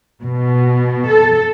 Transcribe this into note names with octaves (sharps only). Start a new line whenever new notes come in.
B2
A4